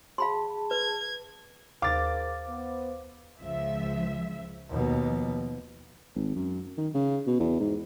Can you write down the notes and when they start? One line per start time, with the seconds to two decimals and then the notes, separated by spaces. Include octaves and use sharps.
0.18 G#4 F5 A5 B5 C6
0.71 B4 G#6
1.82 D#2 G#4 A#4 C5 F5 D6 A6
2.48 B3 C5
3.40 C#2 F3 E5
4.69 D#2 B2 F3
6.15 G#1
6.36 F#2
6.78 D#3
6.95 C#3
7.27 B2
7.40 E2
7.60 G#2